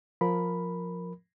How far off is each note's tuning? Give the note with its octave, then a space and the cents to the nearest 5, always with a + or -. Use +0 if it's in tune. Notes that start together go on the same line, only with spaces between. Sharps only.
F3 +15 A#4 +0 B5 +0